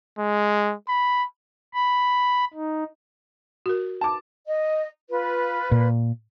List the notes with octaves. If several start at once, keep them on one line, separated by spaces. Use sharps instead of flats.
G#3
B5
B5
D#4
F#4 A#4
A5 D6
D#5
F4 B4
A#2